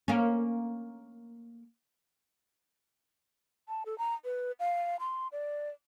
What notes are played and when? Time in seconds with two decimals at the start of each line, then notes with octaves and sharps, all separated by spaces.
0.08 A#3 C#4
3.69 A5
3.86 A4
3.98 A#5
4.25 B4
4.60 F5
5.00 C6
5.32 D5